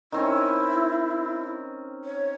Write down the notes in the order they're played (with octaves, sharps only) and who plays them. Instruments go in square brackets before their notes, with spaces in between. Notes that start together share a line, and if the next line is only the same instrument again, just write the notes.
[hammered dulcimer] D#3 C4 C#4 [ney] E4
[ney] C#5